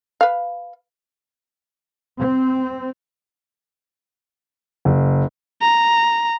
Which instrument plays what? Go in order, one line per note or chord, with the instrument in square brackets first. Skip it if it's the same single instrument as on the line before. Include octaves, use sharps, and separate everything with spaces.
[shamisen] B4 F5
[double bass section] C4
[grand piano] F#1
[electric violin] A#5